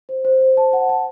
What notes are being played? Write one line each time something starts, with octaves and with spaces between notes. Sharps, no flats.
C5
C5
C5
A5
F#5
A5